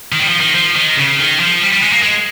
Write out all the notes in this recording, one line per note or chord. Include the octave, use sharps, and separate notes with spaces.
D#3
G3
F3
D#3
F3
D#3
C#3
D#3
F3
G3
G3
G#3
A#3
G#3